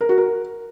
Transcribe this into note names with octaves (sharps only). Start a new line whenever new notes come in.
A#4
F#4
A#4